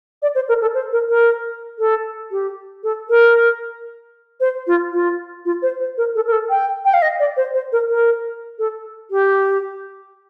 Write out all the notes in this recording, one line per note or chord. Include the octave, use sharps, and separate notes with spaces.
D5
C5
A#4
A4
C5
A#4
A#4
A4
G4
A4
A#4
C5
F4
F4
F4
C5
C5
A#4
A4
A#4
A4
G5
G5
F5
D#5
D5
C5
C5
A#4
A#4
A4
G4